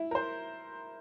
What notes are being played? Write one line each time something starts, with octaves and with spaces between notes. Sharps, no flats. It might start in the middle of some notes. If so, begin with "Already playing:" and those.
Already playing: E4
A#4
C5